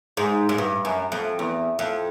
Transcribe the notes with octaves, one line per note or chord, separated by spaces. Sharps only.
G#2
G#2
G2
F#2
F2
E2
F2